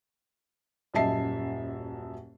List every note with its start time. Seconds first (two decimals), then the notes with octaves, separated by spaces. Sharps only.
0.94 D#1 F#2 D#5 E5 A5 C7